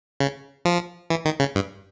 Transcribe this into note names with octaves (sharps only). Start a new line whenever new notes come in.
C#3
F3
E3
D#3
C#3
G2